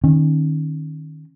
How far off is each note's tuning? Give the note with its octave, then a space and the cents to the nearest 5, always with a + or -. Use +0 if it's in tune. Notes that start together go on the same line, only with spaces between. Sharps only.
D#3 -15 C#4 -35